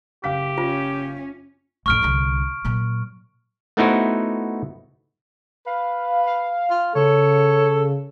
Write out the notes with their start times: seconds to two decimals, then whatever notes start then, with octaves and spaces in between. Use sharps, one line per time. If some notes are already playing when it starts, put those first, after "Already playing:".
0.24 F#1 G4 F5 B6
0.58 C#4 F4
1.86 A1 F2 C#6 F6 D7
2.02 C2 D3
2.65 A#2 F#3
3.77 A3 B3 D#4 E4 F#4 C5
5.66 B4 F5
6.26 F5
6.70 F4
6.95 C#3 A4 C#5